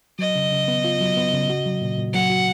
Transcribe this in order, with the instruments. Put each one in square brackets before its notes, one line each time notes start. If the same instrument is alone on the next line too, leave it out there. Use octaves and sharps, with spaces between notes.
[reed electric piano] F#3 [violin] D#5
[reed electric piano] C#3
C#3
B3
F4
F#3
B3
C#3
F#4
F#3
A#2
A#2
[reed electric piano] F#3 [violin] F#5
[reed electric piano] F#4